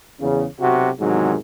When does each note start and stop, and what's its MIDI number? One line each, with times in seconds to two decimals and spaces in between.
0.20 0.45 40
0.20 0.45 49
0.60 0.90 35
0.60 0.90 48
0.60 0.90 66
1.00 1.35 40
1.00 1.35 44
1.00 1.35 48
1.00 1.35 51
1.00 1.35 54